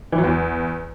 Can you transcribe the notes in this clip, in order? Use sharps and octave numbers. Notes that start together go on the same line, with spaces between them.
E3
F#3
E2